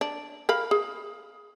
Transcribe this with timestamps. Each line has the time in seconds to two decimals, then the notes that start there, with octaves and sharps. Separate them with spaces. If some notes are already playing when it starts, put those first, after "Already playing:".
0.01 D4
0.49 A#4 F5 B5
0.71 G#4